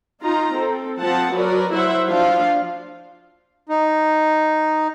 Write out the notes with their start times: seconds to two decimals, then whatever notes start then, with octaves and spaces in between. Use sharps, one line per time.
0.21 D#4 F4 A#5
0.52 C4 A4
1.00 F3 C4 F#5 A5
1.34 F#3 A#4 B4 D5
1.73 F#3 E4 C5 E5 F#5
2.07 F3 D4 F4 F5
3.69 D#4